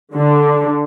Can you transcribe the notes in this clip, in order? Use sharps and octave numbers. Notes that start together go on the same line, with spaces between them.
D3